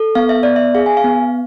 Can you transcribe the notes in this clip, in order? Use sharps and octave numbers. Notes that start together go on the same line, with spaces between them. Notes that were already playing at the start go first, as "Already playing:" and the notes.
Already playing: A4
B3 F5
E5
B3 D5
E5
G#4 F5
G#5
F5
B3